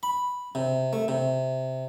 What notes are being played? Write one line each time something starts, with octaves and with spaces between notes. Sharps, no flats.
B5
C3
A3
C3